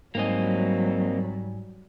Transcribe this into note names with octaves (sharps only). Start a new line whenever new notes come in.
G#2 F#3 G3 A#3 C4 D#5 G#5